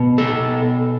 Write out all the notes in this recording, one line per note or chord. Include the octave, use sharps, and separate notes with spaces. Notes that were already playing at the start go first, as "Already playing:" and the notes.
Already playing: B2 B3
A4